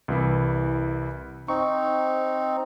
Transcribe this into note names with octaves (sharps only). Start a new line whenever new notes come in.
C2 E3 E4
C4 D#4 C#6